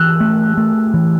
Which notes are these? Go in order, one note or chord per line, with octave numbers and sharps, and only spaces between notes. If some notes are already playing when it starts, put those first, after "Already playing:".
Already playing: E3 E6 F#6
A3
A3
E3